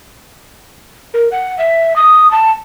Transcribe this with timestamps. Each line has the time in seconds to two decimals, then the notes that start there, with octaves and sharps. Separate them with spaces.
1.14 A#4
1.32 F#5
1.58 E5
1.96 D#6
2.31 A5